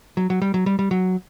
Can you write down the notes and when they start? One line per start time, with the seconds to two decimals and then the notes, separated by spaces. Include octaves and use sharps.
0.17 F#3
0.30 F#3
0.42 G3
0.54 F#3
0.66 G3
0.79 G3
0.91 F#3